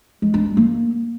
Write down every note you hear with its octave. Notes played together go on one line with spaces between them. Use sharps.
G#3
D4
G#3
A#3